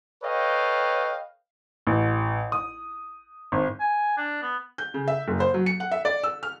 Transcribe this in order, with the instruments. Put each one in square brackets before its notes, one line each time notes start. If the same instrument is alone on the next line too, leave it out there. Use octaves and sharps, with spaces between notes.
[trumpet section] A4 B4 C#5 D#5 F5 G5
[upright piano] A1
D#6
G#1
[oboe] G#5
D4
B3
[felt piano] G6
C#3
E5
F#1
C5
F#3
C#7
F#5
E5
D5
E6
F6